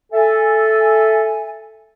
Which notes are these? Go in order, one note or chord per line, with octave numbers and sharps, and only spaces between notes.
A4 E5 G#5